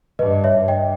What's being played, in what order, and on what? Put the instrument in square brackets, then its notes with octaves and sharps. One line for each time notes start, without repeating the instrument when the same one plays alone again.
[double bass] G2 [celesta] B4 D#5
[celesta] C#5 E5
[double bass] G2
[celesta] D#5 G5